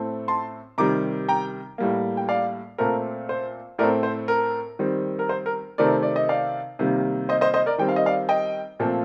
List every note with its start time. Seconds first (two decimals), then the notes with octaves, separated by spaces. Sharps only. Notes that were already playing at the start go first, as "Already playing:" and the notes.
Already playing: A2 A3 C4
0.28 A5 C6
0.78 C3 D#3 G3 A#5 D6
1.29 G5 A#5
1.78 A2 G3 A#3
2.17 G5
2.29 D5 F5
2.78 A#2 A3 C4 A#4
3.29 C5
3.79 A2 A3 C4 A#4 D5
4.03 C5
4.28 A#4
4.79 D#3 G3 C4
5.19 A#4
5.29 C5
5.46 A#4
5.78 C3 D#3 A3 C4 A#4 D5
6.03 D5
6.16 D#5
6.29 D5 F5
6.79 C3 D#3 G3 A#3
7.29 C5 D#5
7.41 C5 D#5
7.54 C5 D#5
7.66 A#4 D5
7.78 D#3 G3 C4 G5
7.89 F5
7.96 D#5
8.06 D5 F5
8.29 D#5 G5
8.80 A#2 F3 A3 C4